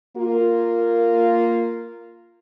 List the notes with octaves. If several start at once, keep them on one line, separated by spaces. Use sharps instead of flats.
A#3 F4 A#4